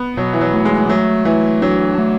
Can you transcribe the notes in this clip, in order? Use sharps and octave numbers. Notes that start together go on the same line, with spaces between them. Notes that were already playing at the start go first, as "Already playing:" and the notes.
Already playing: B3
B2 F#3
E3
F#3
A3
G#3
F#3 A3
E3 A3
F#3 D4
A3